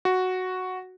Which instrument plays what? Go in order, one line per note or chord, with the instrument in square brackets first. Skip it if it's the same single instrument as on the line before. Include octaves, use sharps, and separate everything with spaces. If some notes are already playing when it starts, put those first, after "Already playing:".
[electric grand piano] F#4